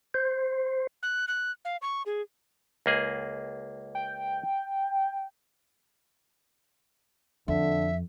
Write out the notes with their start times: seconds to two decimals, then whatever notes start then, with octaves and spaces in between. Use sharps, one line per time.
0.14 C5
1.03 F#6
1.28 F#6
1.65 F5
1.82 C#6
2.06 G#4
2.86 C#2 A#3 G#4
3.95 G5
7.48 F2 D3 E5